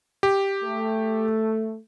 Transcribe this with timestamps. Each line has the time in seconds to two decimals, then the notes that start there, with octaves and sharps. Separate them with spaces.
0.23 G4
0.63 A3